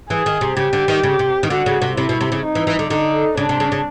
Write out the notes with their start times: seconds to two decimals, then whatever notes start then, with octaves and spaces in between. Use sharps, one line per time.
0.10 E3 G#4
0.26 D#3
0.41 C3
0.57 C#3 G4
0.73 D3
0.88 D#3
1.03 C#3
1.19 C3
1.43 D#3
1.50 D3 F#4
1.66 C#3
1.82 C3
1.97 C3 E4
2.09 B2
2.21 C3
2.32 C#3
2.44 D#4
2.55 E3
2.67 E3
2.79 D3
2.90 D3 D#4
3.37 C#3 D4
3.49 C3
3.60 C#3
3.72 C#3